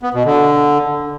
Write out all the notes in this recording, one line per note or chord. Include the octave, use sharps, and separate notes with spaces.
B3
B2
D3